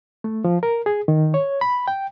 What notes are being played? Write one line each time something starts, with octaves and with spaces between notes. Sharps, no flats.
A3
F3
A#4
G#4
D#3
C#5
B5
G5